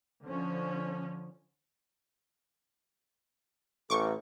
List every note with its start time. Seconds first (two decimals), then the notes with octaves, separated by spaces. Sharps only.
0.23 D3 F3 C#4
3.90 A1 A4 C#6 D6